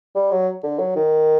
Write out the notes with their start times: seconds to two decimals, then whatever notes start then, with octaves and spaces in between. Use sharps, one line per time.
0.15 G3
0.32 F#3
0.63 D3
0.79 F#3
0.96 D#3